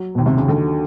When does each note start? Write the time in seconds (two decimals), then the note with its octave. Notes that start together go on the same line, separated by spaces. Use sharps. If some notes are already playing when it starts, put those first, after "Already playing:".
Already playing: F#3
0.15 D#2 B2
0.26 C3
0.37 C#3
0.48 D#2 D3